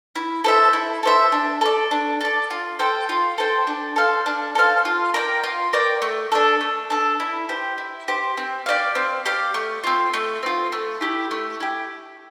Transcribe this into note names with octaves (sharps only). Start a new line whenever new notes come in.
E4
A4 C5 E5
E4
A4 C5 E5
D4
A4 D5
D4
A4 D5
F4
A4 C5 G5
F4
A4 C5 G5
D4
A4 C5 F5
D4
A4 C5 F5
F4
A#4 D5 G5
F4
A#4 D5 G5
A3
D4 A4
A3
D4 A4
E4
G4 C5
E4
G4 C5
C4
G4 D5 F5
C4
G4 D5 F5
A3
C4 F4
A3
C4 F4
A3
E4 G4
A3
E4 G4